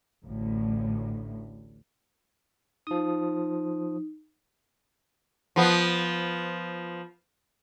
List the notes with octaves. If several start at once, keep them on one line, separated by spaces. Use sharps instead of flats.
A1 D2 A2
F3 D#4 D#6
F3 B3